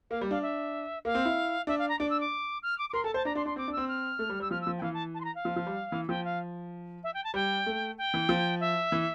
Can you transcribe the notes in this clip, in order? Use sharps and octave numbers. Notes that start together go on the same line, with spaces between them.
A#3 F5
G3
D4 F5
E5
A#3 F5
C4
E4
D4 E5
F5
A#5
D4 D6
E6
D6
F6
D6
D6
A#4 C6
A4 A5
C5 A5
D4 A#5
D4 C6
D4 C6
C4 D6
D4
C4 E6
F6
A3
G3
G3 E6
F3 F6
E6
F3
G5
E3 F5
A5
A5
C6
A#5
F5
F3
F3
G3
E3
F3 G5
F5
E5
G5
A5
G3 G5
A3
G5
E3
F3
E5
E3